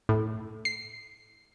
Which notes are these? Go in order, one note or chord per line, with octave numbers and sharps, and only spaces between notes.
A2
C7